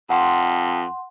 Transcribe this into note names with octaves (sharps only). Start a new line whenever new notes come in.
F2 F#5 C6